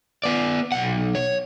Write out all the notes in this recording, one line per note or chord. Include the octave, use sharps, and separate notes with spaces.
B3 D5
B1 F#5
C#5